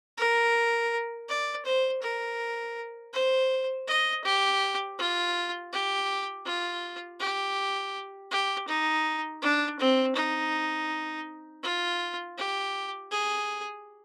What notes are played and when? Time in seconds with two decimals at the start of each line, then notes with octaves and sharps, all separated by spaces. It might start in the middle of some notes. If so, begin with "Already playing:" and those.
0.17 A#4
1.29 D5
1.65 C5
2.02 A#4
3.13 C5
3.87 D#5
4.24 G4
4.99 F4
5.72 G4
6.45 F4
7.20 G4
8.31 G4
8.68 D#4
9.42 D4
9.79 C4
10.16 D#4
11.63 F4
12.37 G4
13.11 G#4